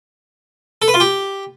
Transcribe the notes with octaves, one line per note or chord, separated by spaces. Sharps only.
A4
B4
F4
G4